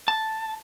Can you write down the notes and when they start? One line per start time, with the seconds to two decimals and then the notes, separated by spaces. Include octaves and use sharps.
0.08 A5